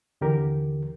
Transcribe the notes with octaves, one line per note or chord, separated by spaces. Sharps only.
D#2 D3 E3 G4 A#4